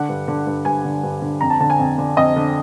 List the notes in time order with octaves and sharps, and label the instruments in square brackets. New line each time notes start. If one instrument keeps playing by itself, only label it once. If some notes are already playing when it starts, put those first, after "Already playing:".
Already playing: [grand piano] D3 F#5
G2
D3
G2
G2 G#5
D3
G2
D3
F2 A#5
A5
D3 A5
G#5
F2
D3
F2 D#5
D3